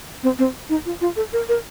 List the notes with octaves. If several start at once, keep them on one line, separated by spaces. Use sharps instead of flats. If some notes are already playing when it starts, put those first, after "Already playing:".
C4
C4
D#4
F4
F4
A4
A#4
A#4